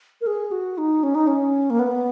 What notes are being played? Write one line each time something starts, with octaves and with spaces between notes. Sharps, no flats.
A#4
G#4
F#4
D#4
C#4
D#4
C#4
A#3
B3